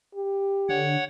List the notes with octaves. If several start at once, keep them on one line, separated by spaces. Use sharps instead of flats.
G4
D3 C#5 F#5